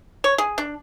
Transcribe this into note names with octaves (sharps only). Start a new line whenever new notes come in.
C#5
G#4
D4